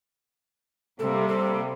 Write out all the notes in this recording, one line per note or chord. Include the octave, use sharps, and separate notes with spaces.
C3 G3 A#3 A4
A4